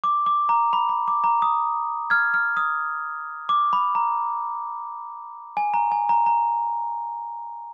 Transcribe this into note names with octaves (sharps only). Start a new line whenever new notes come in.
D6
D6
A#5
B5
B5
D6
A#5
D#6
F6 G#6
F6
D#6
D6
B5
A#5
G#5
A#5
G#5
A#5
A#5